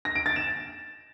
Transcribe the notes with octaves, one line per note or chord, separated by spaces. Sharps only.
A#6
D7
A6
E7